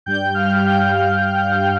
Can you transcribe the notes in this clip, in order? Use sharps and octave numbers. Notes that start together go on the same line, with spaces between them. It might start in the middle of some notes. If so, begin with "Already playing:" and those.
G2 G3 G5 G6
F5 F6
G5 G6